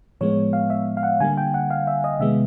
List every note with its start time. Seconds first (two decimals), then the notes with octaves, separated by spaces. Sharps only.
0.21 A2 F3 G#3 B3 C#5
0.53 F5
0.70 E5
0.97 F5
1.03 F#5
1.20 D3 G3 A#3 G#5
1.37 G5
1.54 F#5
1.70 F5
1.87 E5
2.04 D#5
2.20 C3 D#3 G#3 B3 E5